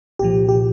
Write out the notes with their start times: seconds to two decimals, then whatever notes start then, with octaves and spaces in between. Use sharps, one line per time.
0.19 C2 A#2 F3 G4
0.49 G4